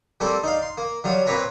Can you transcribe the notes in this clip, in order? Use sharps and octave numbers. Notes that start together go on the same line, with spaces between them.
G3 A#3 C4 A4 D5
D#4 D5 F5
C6
A#3
F#3 G3 F4
A#2 A#3 C4 B4 C#5 A#5